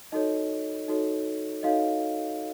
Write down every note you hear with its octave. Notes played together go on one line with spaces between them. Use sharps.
D#4 F#4 A4 C#5 D#5
D#4 F#4 A4 C#5
D#4 F#4 A4 C#5 D#5 F5